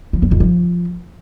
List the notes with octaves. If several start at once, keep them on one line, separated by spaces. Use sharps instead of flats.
F3
E2
F2
F3